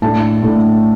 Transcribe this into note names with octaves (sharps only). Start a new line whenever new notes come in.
A2 A3 D4 A5
A2 A3 D4